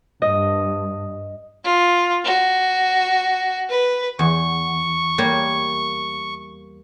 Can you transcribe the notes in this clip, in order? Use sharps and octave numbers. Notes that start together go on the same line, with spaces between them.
G2 D#5
F4
F#4
B4
E2 C#6
G3 A#3 C#5